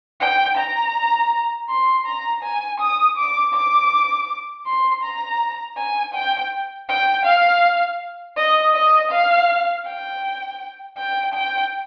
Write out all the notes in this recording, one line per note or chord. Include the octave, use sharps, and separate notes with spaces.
G5
A#5
C6
A#5
G#5
D#6
D6
D6
C6
A#5
G#5
G5
G5
F5
D#5
D#5
F5
G5
G5
G5